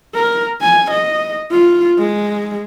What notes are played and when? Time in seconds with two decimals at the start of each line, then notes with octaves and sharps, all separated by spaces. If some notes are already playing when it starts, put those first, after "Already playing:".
0.14 A#4
0.61 G#5
0.91 D#5
1.51 F4
1.98 G#3